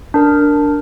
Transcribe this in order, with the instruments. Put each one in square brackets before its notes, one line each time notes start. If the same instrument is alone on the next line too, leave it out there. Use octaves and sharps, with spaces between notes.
[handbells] D4 A#4